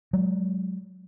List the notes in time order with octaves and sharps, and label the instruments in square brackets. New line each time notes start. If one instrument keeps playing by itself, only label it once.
[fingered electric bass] F#3 G#3